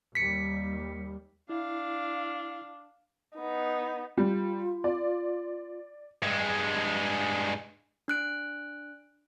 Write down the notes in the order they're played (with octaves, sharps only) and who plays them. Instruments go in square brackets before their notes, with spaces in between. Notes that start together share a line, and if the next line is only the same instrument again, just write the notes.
[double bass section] D#2 G3 [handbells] B6 C#7
[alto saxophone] D4 [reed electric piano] E4 [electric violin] F5
[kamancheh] B3 D#4
[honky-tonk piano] G3 [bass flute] F4
[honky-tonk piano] D5
[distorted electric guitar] G2 G#3
[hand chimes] D4 F#6 D7